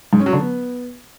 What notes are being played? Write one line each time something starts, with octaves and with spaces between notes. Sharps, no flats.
G#2
C#4
F#3
D3
B3